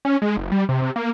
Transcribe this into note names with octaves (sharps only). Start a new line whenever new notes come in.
C#4
G#3
F#1
G3
C3
C3
A#3